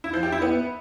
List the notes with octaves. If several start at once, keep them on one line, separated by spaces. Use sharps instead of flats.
E4
F3
G4
E4
B3